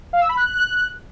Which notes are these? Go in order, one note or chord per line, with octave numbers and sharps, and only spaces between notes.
F5
E6
B5
F#6